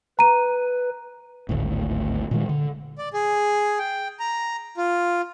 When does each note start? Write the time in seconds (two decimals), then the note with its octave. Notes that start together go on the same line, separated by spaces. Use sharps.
0.19 B4 A#5 D#7
1.49 G#1 D2 A2
2.31 A#2 D#3 G#3
2.49 D3
2.98 D5
3.14 G#4
3.79 G5
4.20 A#5
4.78 F4